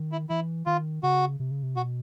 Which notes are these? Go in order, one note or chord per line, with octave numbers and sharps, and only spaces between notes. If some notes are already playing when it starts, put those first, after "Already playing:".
Already playing: D#3
E4
E3 E4
D#3 F4
C#3 F#4
C3
C#3
C3
B2 F#4